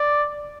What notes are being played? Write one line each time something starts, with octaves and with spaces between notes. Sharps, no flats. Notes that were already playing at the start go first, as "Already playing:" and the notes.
Already playing: D5